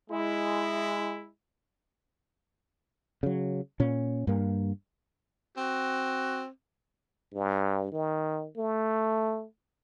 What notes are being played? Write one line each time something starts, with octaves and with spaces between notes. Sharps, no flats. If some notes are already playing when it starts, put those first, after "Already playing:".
G#3 E4
C#3 F#3
A#2 C#4
G2 A#3
C4 F#4
G2
D#3
A3